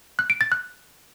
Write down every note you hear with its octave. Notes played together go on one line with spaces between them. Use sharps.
F#6
D7
A6
F#6